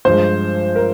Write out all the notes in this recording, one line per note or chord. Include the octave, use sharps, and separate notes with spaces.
G2 F3 G#3 C5
A#4